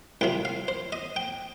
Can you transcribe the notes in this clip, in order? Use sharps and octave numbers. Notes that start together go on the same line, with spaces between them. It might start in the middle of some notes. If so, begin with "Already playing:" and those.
C2 C3 F3 G5
F5
C5
D#5
G5